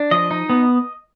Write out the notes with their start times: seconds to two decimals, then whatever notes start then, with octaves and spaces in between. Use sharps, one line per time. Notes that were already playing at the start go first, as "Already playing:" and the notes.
Already playing: D4
0.11 F3 D#5
0.31 D#4
0.49 B3